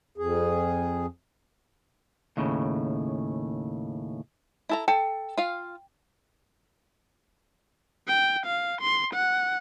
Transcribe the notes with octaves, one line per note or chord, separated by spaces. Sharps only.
F2 G#4
D#2 A2 C#3
E4 A4 A#5
A4 G5
F4 F5
G5
F5
C6
F#5